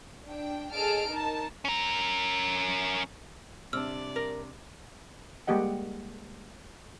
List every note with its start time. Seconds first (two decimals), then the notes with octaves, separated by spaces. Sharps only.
0.24 D4 G5
0.72 G#4 A4 D#5 A5 F6 D7
1.07 D#4 A#4 A5
1.65 C#4 A#4
3.73 C3 G3 D4 D5 E6 F6
4.16 A#4
5.47 G3 G#3 A#3 G4 D#5 F#5